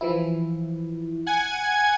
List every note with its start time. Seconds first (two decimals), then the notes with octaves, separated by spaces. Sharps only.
0.01 E3 F3 E4
1.26 F#5 G#5 G#6